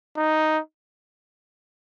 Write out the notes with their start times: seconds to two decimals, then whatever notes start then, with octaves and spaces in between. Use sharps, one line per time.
0.17 D#4